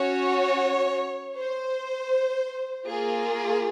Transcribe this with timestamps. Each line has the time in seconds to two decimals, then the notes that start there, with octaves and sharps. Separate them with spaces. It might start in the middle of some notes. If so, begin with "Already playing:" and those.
Already playing: C#4 F#4 C#5
1.37 C5
2.87 A#3 F4 G#4